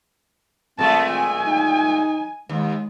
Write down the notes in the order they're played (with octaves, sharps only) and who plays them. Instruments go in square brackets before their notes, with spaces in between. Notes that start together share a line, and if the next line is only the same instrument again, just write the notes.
[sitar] A#2 G#3 A3 [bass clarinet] C4 [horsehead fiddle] E5 A5
[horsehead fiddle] G#5
[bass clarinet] D#4
[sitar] D#2 [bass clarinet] G#3